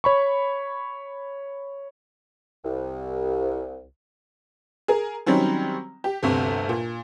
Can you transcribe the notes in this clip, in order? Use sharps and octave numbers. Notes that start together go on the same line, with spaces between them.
C#5 B5 C#6
C2
G#4 A#4
D#3 F#3 G3 C4 C#4
G4
G1 D2 C3
A#2